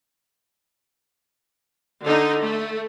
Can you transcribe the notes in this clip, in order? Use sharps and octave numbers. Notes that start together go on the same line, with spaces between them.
D3 D#4
A3